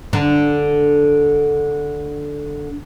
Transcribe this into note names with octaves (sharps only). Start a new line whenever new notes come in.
D3 D4